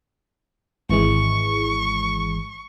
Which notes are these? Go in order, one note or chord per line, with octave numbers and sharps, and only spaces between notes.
G#1 E3 G#3 C#6